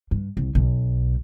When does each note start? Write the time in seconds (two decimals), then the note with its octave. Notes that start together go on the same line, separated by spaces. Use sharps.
0.11 G2
0.37 C2
0.55 B1